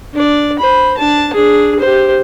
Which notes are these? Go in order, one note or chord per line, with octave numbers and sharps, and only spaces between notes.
D4 D5
C5 B5
D4 A5
D4 G#4
G4 C5